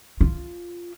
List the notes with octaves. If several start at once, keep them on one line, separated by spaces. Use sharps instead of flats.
F4